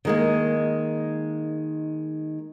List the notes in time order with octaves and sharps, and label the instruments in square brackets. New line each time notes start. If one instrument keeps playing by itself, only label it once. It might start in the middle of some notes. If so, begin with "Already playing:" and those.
[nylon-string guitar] D#3 G#3 A#3